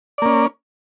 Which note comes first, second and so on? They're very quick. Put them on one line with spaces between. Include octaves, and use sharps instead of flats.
D5 A#3 C#4